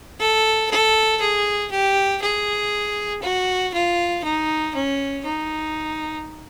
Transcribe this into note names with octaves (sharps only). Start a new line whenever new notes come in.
A4
A4
G#4
G4
G#4
F#4
F4
D#4
C#4
D#4